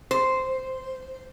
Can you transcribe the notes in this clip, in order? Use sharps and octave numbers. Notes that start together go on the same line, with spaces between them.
C5